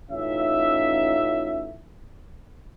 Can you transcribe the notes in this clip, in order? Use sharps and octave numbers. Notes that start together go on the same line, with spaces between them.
A1 C#4 D#4 F4 E5